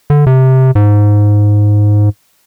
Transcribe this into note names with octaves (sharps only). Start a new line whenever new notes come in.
D3
C3
G#2